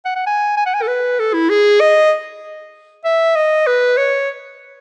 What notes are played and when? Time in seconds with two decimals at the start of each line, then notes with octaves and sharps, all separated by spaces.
0.05 F#5
0.16 F#5
0.26 G#5
0.57 G#5
0.66 F#5
0.74 G#5
0.82 A4
0.87 B4
1.19 A4
1.34 E4
1.49 G#4
1.81 D#5
3.04 E5
3.35 D#5
3.67 B4
3.97 C#5